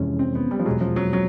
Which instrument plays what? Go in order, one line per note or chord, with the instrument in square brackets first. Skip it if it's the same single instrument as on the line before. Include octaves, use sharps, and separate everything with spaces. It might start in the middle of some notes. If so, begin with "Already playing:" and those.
Already playing: [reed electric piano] F2 C3 E3 G#3 C#4
[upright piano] C4
B3
G3
F3
[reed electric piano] E2 B2 G#3 [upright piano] F#3
[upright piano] F3
F#3
F#3